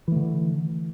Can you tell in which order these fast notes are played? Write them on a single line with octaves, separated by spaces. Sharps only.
E3 A3 D3